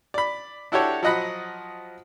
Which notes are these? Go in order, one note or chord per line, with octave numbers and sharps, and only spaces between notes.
D5 B5
D4 E4 F#4 G4 A4 C#5
F3 F#3 D#5 F#5 B5